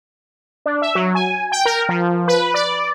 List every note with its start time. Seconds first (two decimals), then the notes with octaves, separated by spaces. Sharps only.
0.66 D4
0.82 E5
0.95 F#3
1.15 G#5
1.52 G5
1.65 A#4
1.89 F3
2.28 B4
2.54 D5